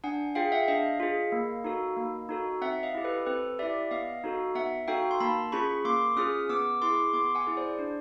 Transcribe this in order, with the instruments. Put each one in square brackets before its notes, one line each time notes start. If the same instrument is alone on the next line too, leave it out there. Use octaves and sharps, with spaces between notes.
[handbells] D4 F#5 G#5
F4 G#4 F5 G5
E5 F#5
D4 D#5 F5
F4 G#4
A#3
D#4 F#4 A4
A#3
D#4 F#4 A4
C4 E5 F#5
D#5 F5
E4 G4
A4 B4
C4 A4 B4
E4 G4 D5 E5
B3 D#5 F5
D#4 F#4 A4
B3 E5 F#5
D#4 F#4 A4 F5 G5
C6
A#3 A5 B5
C#4 F4 G#4 B5 C#6
A#3 C6 D6
C#4 F4 G#4 D#6 F6
B3 D6 E6
E4 G#4 C6 D6
B3 C6 D6
F#5 G#5
E4 G#4
C5 D5
D4